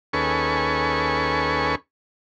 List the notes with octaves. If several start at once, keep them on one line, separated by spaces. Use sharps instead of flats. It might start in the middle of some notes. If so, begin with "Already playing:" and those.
D#2 C#4 G#4 A4 B4 C#6